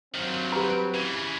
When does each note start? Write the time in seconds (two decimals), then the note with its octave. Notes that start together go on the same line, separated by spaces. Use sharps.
0.14 G2 D#3 F#3 C4
0.52 G4 B4 A#5
0.94 C#3 E3 G#6 B6